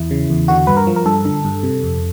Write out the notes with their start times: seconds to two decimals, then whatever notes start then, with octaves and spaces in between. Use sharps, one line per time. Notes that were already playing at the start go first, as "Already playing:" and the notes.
Already playing: E2 E4
0.11 C#3
0.30 E2
0.48 D3 F#4
0.67 G2 B4
0.77 A#4
0.87 F3
0.96 A#4
1.06 G2 A4
1.25 D3
1.45 G2
1.63 C3
1.84 F2